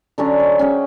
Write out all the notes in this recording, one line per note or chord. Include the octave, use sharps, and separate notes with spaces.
D3 F#3 C#4 D4
C5 D#5
C#4 G#4 F#5 G5